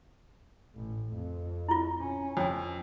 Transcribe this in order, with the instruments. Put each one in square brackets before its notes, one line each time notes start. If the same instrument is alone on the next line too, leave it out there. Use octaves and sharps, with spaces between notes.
[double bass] A1
F2
[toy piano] E4 F4
[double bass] C#4
[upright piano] F2 [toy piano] C#5 G#5